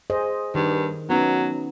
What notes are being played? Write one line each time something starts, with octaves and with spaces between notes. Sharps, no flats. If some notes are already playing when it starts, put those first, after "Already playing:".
G#4 C5 D#5
G2 D#3
F#3 B3 C#4 D#4